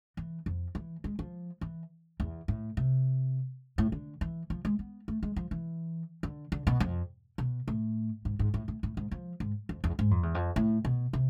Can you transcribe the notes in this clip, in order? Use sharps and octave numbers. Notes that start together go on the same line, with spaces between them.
E3
F2
E3
G#3
F3
E3
E2
A2
C3
A2
D3
E3
F3
G#3
B3
A3
G#3
F3
E3
D3
D3
B2
F2
B2
A2
G#2
G#2
A2
A2
A2
G#2
F3
G#2
F2
E2
G#2
F2
E2
F2
A2
B2
C3